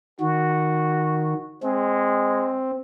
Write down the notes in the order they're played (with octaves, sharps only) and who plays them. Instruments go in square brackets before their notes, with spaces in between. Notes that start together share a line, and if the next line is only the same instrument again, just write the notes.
[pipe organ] D#3 [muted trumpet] F#4
[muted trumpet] G#3 [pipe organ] C4